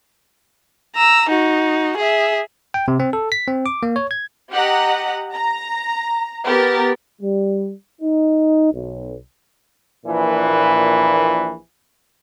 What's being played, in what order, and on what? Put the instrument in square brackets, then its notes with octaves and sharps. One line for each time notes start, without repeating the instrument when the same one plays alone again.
[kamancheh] A#5 E6
D#4 F#4
G#4 E5
[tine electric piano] G5
C3
C4
A4
B6
C4
D6
A#3
C#5
G#6
[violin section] G4 D#5 F#5 A#5
A#5
B3 G4 A#4 A6
[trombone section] G3
D#4
B1
A#1 A#2 E3 B4